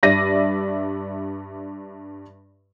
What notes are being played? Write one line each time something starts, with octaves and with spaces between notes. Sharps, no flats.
G2 D5 E5 A#6 D#7